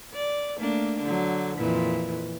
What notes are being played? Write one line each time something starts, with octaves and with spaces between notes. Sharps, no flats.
D5
A3 A#3 D4
D3 F#3
F2 A#2 E3